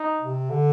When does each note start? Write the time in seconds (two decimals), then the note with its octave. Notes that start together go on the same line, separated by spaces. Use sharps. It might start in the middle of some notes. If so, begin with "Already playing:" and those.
Already playing: D#4
0.22 C3
0.50 D3